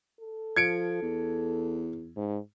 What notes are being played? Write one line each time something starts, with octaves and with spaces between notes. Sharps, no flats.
A4
F3 G#6 C#7 D7
E2
G#2